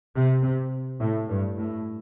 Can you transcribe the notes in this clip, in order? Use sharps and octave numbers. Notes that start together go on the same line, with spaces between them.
C3
C3
A2
G2
A2